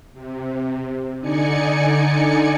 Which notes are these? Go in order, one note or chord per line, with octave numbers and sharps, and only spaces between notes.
C3
D3 D#4 D5 G#5 C#7